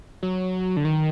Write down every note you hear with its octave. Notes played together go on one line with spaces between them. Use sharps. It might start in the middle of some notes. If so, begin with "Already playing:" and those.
F#3
D3
D#3